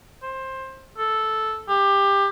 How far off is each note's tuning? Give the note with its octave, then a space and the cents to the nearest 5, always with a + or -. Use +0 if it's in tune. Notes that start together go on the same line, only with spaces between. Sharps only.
C5 +20
A4 -5
G4 +20